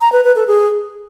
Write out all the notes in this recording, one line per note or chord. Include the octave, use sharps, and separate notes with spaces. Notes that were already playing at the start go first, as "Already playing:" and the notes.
A#5
B4
B4
A4
G#4